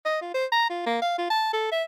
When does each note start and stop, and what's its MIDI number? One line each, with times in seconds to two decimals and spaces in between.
0.05 0.20 75
0.21 0.34 65
0.35 0.45 72
0.52 0.69 82
0.70 0.86 65
0.86 0.99 58
1.02 1.18 77
1.18 1.28 65
1.30 1.52 81
1.53 1.70 69
1.72 1.83 76